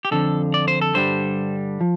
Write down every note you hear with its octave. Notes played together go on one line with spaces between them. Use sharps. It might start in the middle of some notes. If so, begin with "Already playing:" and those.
G4
F2 D3 F3 A4
D5
C5
A4
G2 D3 G3 C5
F3